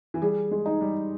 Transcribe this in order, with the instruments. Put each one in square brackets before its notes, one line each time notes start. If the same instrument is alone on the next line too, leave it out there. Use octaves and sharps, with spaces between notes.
[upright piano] E3
[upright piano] G3 [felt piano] G#4
[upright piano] G#3
[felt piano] D#4
[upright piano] G3